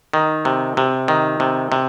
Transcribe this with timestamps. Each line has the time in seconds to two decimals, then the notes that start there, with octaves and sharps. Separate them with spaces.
0.14 D#3
0.45 C3
0.77 C3
1.08 D#3
1.40 C3
1.72 C3